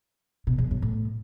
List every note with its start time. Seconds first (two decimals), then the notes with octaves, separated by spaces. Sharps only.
0.47 B2
0.58 E2
0.71 F#2
0.82 A2